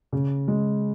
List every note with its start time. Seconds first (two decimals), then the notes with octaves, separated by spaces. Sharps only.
0.13 C#3
0.48 G#3